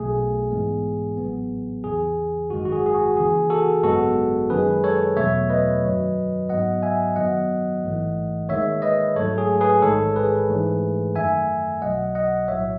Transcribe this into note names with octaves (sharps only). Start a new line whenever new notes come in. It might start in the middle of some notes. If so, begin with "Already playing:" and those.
Already playing: B1 B2 A3 G#4
G#2 E3 G#3 B3
A1 A2 F#3 B3
E2 C#3 E3 G#4
G#1 F#2 D#3 G#3 F#4
F#4
G#4
G#4
F#4
D#2 C#3 E3 G#4
F#4 A4
G#1 F#2 C#3 G#3 B3 F#4 A4
F#2 D#3 G#3 G#4 B4
A4 C#5
E2 B2 F#3 A3 C#5 E5
B4 D#5
F#2 D#3 F#3
G#2 F#3 B3 D#5 F#5
E5 G#5
F#2 D#3 F#3 B3 D#5 F#5
A1 G#2 E3 A3
D#2 D#3 G#3 C#5 E5
B4 D#5
G#2 F#3 A3 A4 C#5
G#4
G#4 B4
A1 G#2 D#3 G#3 A4 C#5
G#4 B4
G#2 E3 A3
F#2 D#3 A3 E5 G#5
B1 B2 F#3 D#5 F#5
D#5 F#5
B1 A2 F#3 C#5 E5